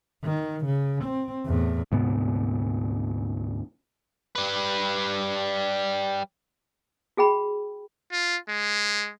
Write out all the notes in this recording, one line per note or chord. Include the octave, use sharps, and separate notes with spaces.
D#3
C#3
C4
E2 A2
D2 G#2 C3 B3
G3 B4
F#4 G#4 G5 B5
F4
G#3